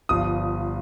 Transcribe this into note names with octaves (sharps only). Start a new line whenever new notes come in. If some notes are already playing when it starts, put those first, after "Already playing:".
G1 G2 F3 D#6